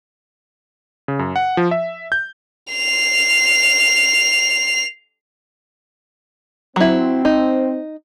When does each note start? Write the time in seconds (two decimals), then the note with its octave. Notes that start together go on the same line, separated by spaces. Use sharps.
1.08 C#3
1.19 F#2
1.36 F#5
1.57 F3
1.71 E5
2.12 G6
2.73 C7 F7
6.76 F#3 C4 E4
7.25 D#4